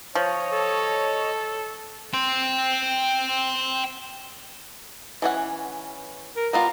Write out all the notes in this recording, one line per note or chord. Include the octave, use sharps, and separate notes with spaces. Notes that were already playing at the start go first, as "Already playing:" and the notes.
F3 C#5 D#5
A4
G5 C6
E3 C#4 F#5
A#4
G3 B3 F4 A#5